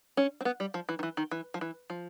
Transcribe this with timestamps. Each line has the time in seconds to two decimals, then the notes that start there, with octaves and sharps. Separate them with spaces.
0.17 C#4
0.41 C4
0.45 B3
0.60 G3
0.74 F3
0.89 E3
0.99 D#3
1.03 E3
1.17 D#3
1.31 E3
1.54 F3
1.61 E3
1.90 F3